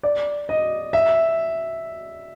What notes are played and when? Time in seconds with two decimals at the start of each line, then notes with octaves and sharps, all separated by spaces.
0.03 D5
0.49 D#5
0.93 E5